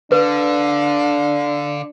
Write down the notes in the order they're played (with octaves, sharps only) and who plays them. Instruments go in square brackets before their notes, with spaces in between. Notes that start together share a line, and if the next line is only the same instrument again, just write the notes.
[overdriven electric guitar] D3 [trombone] D4 [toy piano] B4 [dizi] F5